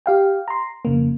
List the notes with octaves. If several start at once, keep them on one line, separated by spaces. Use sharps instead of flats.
G4 F5 G5
A#5 C6
F2 C#3 A#3